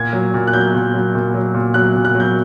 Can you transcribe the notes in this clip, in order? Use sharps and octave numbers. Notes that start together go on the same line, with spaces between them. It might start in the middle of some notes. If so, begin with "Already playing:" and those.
Already playing: A#2 G#6
F#3
A#2
F#6
F#3 G6
A#2
F#3
A#2
F#3
A#2
F#3 F#6
A#2
F#6
F#3
G6